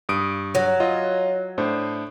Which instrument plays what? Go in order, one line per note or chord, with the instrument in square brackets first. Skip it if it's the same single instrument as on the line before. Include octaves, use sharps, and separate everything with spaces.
[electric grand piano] G2 D#6 D7
[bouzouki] F#3
[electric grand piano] F4 D#5
A2 D4 C5